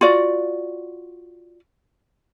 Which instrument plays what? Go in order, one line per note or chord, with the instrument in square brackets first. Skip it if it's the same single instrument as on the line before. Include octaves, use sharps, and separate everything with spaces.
[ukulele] F4 F#4 D5